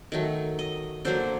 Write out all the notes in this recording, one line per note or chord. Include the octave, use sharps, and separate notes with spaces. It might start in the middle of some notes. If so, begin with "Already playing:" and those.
D#3 F#3 A3
D#5
D3 F#3 A#3 C5